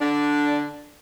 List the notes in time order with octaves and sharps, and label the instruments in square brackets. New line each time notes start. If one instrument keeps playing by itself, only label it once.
[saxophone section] D3 D4